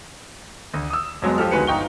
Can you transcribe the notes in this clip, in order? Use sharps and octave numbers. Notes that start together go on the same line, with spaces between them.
D2
D#6 E6
F2 F#3 G#3 B3
F3 G4 A4 F6
D2 D#3 G#3 F#4 B4 C#7
G1 D#4 G5 C#6 G7